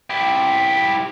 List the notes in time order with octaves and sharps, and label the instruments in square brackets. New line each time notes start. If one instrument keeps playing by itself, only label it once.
[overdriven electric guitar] E4 G4